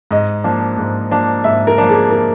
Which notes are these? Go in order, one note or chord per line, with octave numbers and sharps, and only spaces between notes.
G#2 D#5
F3 A#3 D4
G#2
F3 A#3 D4
G#2 E5
A#4
F3 A#3 D4
G#4
A#4